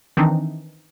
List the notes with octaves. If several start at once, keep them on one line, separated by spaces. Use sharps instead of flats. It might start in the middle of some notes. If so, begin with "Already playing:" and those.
D#3 E3 C4 D4 D#4